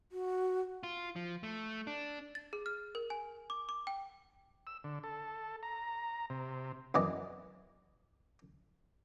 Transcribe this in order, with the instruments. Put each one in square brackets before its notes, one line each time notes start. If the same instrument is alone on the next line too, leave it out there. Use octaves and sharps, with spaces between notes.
[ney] F#4
[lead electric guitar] F4
F3
A3
D4
[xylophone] A6
G#4
F6
A#4
G#5
D6
D6
G5
[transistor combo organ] E6
D3
A4
A#5
C3
[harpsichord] F#2 E3 D5 D#5